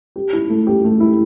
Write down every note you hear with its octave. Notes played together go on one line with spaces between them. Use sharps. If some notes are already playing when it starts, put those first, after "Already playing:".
G4
E4
A3
G4
A3
E4